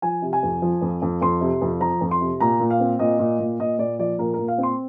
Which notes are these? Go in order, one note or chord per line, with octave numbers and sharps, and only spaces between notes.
F3 G#5
C3
G#5
F2
F3
F2
F2
F2 C6
C3
F2
F3 A#5
F2
C6
C3
A#2 A#5
A#2
F5
C4
A#2 D#5
A#2
A#2
A#2 D#5
A#2 D5
F3 D5
A#2 A#4
A#2 A#4
F5
C4
C6